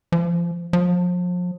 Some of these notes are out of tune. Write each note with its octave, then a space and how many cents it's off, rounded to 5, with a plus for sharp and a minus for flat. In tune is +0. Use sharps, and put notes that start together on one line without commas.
F3 -25
F3 +35